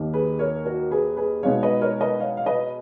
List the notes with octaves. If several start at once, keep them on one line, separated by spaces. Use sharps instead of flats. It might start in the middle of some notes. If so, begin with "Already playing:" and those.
Already playing: D#2 D#3 A#3 D#4
G#4 B4
A#4 C#5
F#4 A#4
G#4 B4
G#4 B4
B2 G#3 B3 D#4 C#5 F5
B4 D#5
A#4 C#5
B4 D#5
C#5 F5
F5
B4 D#5